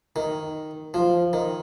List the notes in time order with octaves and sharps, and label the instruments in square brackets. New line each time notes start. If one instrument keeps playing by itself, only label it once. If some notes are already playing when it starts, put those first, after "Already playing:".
[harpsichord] D#3
F3
D#3